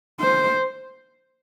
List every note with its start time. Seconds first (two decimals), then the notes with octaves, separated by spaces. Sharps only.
0.20 C5